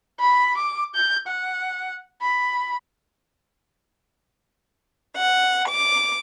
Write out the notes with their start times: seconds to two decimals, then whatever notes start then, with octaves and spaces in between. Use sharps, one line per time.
0.20 B5
0.57 D6
0.94 G6
1.27 F#5
2.21 B5
5.16 F#5
5.69 D6